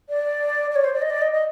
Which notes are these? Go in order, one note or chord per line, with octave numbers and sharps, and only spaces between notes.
D5
D5
C#5
C5
D5
D#5
D5
D#5
D#5